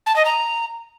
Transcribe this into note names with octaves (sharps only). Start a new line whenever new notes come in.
A5
D#5
A#5